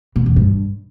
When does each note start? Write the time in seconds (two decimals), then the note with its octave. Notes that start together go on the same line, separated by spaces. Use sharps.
0.16 B2
0.26 E2
0.36 G2